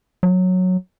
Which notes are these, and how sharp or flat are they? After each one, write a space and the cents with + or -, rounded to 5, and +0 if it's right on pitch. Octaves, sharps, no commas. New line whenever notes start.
F#3 -10